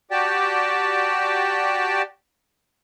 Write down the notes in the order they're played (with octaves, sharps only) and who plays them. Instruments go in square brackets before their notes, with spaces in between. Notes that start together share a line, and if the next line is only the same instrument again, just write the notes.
[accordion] F#4 G4 D5 G5 A5